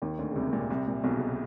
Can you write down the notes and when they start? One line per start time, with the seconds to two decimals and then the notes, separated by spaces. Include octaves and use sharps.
0.02 D#2 D#3
0.19 D2 D3
0.31 C#3
0.36 C2 C3
0.53 A#2
0.70 C2 C3
0.87 A#2
1.03 B1 B2
1.15 C#3
1.20 C3